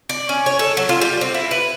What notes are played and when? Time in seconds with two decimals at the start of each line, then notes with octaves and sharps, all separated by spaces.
0.09 D5
0.29 C#4
0.46 C#5
0.59 A4
0.77 F#3
0.89 F4
1.01 G3
1.21 C4
1.34 E4
1.51 B4